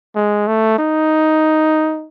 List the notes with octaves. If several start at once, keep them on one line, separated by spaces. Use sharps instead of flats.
G#3
A3
D#4